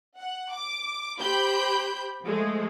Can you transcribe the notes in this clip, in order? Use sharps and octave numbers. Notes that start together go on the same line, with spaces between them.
F#5
D6
G4 C5 B5 G6
F3 G#3 A3